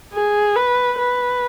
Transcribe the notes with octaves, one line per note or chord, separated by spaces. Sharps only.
G#4
B4
B4